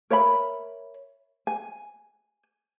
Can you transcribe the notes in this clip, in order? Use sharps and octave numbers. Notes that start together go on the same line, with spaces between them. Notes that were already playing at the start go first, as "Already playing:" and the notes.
A#4 C#5 E5 B5
G#5